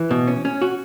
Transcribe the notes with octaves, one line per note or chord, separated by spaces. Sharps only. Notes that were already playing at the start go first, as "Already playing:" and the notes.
Already playing: E3
B2
C#4
C#4
F#4